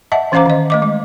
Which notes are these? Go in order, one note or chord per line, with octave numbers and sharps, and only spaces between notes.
D#5 E5 F#5 A5
E3 C#4 C5 F5 A#5 D6
D#3 D#5
A3 D#5 D6
G#3